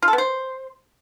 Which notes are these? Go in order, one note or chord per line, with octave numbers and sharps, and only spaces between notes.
F4
A4
B3
C5